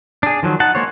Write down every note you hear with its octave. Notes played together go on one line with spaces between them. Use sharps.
D4 G#4
D#3 F3 F#3
D#4 F#5 A5
G#3 A#3 C5 C#5